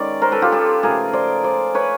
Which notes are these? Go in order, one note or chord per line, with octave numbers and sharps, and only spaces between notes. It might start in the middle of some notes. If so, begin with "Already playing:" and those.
Already playing: D#3 G#3 C#4 D5
A#4 C5
A4 B4
F4 G4
G4 A4
C#3 F3 A3 G#4 A#4
C5 D5
C5 D5
B4 C#5